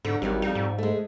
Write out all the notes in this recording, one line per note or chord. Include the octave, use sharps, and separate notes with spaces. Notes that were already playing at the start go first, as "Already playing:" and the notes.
G#2 D3
G#1 D#3 F#3 G3
F2 G3 D#4
G#2
G#3 A3